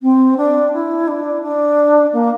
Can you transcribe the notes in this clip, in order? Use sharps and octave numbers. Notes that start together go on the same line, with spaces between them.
C4
D4
E4
D4
D4
A#3